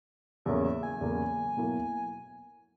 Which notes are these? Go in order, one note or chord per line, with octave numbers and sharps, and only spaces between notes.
E2 C#3 F#3 A#3 C#4 E5
E5
G#5
E2 C#3 F#3 A#3 C#4
B2 F#3 A#3 E4